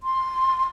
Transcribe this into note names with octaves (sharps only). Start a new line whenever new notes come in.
C6